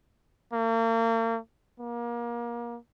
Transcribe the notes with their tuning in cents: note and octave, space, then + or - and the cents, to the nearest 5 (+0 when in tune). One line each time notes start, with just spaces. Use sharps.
A#3 -40
A#3 +30